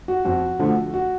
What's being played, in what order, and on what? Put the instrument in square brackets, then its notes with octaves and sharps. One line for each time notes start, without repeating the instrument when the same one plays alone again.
[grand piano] F#4
F2 F#4
D3 F3 A3
F#4